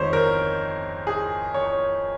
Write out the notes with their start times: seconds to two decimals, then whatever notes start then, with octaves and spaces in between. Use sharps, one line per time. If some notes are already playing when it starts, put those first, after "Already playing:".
Already playing: F2 D#3 G#3 C5 C#5
0.13 A#4
1.07 G#4
1.54 C#5